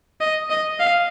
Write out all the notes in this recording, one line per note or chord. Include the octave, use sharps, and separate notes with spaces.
D#5
D#5
F5